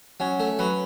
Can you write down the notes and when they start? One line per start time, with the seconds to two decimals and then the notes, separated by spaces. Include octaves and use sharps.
0.20 F#3 C#4
0.40 A3
0.59 F#3 B4